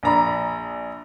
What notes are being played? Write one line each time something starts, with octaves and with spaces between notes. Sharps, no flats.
A#1 D4 A#5 B5